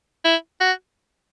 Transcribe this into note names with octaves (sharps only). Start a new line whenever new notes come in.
E4
F#4